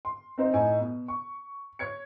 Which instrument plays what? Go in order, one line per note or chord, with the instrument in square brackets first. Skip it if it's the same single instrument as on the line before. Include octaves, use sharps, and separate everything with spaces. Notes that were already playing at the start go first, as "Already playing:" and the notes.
[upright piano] C6
C4 D#4 C5
A2 D#4 G#5
B2
C#6
C#5 G#6 C#7